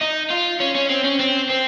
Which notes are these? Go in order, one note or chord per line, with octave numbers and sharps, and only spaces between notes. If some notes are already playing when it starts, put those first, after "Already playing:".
D#4
F4
C#4
C#4
C4
C#4
C4
C4